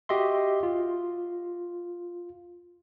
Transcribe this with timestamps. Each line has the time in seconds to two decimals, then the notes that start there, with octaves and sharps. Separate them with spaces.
0.09 F#4 G4 D#5 E5 C6
0.63 F4